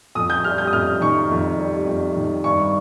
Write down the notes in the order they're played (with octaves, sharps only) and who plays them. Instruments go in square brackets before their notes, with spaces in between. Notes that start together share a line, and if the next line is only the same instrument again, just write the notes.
[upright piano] F2 D#6
G6
G3 F6
G6
D#6
F2 F6
D#3 C#6
F2
G3
F2
D#3
G2 C#6